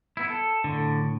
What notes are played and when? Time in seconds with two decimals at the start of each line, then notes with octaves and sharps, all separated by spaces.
0.17 B3 E4
0.30 A4
0.64 A2 D3